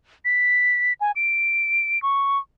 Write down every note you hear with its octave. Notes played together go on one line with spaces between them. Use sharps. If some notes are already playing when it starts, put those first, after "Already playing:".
B6
G#5
D7
C#6